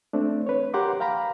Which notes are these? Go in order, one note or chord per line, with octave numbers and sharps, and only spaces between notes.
A3 C4 D4
B4 C#5
G4 A#4 F#5 A#5 C6 D6
F5 G5 A#5 B5